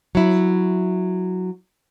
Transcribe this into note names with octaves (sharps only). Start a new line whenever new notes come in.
F#3 E4